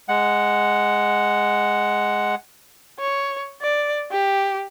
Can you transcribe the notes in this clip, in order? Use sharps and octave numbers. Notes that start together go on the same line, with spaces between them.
G#3 F#5
C#5
D5
G4